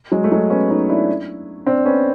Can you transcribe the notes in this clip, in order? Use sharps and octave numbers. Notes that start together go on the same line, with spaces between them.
F#3 G#3
A3
F#3 G#3
B3 C#4
C#4 D#4
D4 E4
C4 D4
B3 C#4